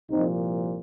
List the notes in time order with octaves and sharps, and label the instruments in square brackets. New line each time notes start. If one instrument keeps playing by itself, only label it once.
[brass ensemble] C2 A#2 F3 C4 D#4